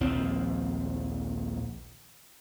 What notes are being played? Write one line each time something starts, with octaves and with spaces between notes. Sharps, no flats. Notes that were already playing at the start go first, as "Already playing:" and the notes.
A#1 D#2 F3 C4